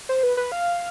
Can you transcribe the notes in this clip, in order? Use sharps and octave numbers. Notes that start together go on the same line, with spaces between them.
C5
B4
B4
F5